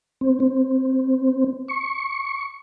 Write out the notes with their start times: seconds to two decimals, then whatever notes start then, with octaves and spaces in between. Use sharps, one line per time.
0.21 C4
0.40 C4
1.68 C#6